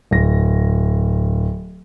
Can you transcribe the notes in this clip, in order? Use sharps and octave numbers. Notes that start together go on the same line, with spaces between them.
D1 A#6